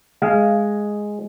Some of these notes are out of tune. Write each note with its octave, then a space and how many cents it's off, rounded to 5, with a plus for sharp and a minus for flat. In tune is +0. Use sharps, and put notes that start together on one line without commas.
G#3 +0 F5 -15